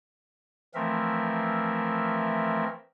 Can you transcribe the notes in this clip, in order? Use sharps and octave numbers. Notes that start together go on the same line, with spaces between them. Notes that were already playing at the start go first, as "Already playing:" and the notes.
E3 F3 A3 C4 A#4 E5